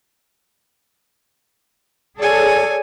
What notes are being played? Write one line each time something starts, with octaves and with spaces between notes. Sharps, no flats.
G#4 A4 C#5 D5 G#5